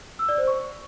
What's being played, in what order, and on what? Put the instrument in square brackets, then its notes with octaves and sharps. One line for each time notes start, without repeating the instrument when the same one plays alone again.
[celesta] E6
D5
C5
C#6